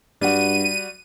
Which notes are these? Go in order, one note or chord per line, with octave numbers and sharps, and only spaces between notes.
G2 G3 F#4 D#7